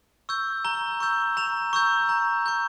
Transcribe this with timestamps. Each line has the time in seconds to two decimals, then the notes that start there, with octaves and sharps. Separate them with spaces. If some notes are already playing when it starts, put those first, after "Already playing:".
0.29 C#6 E6 G6
0.65 A#5 G7
1.00 C#6 E6 G6
1.37 A#5 F7
1.73 C#6 E6 G6
2.09 A#5
2.46 C#6 G6